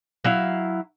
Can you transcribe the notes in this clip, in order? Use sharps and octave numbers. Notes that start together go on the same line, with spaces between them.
F#3 E4 F5